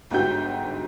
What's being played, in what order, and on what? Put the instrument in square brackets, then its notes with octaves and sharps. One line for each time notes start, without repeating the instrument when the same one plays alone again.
[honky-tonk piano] G1 G#2 F#4 G4 G6